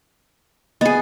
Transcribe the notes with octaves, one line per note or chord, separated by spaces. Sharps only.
B3 G#4 D#5